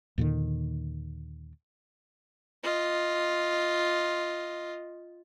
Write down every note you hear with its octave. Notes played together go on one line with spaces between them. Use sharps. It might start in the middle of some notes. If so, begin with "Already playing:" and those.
D#2 A#2 D3 D#3
F4 D#5